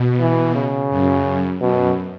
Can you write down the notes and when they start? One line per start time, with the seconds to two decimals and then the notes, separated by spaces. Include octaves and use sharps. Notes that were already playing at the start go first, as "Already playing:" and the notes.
Already playing: B2
0.19 E3
0.55 C#3
0.90 F#2
1.61 F#2 B2